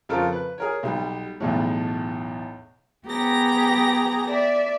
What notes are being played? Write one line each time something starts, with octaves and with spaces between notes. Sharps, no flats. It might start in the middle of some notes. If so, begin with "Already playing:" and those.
F2 C#3 F4 A4 A#4
B4
G#4 A#4 C#5
B1 G3
B1 E2 A2
B3 G4 G#4 A#5 A#6
D5 E5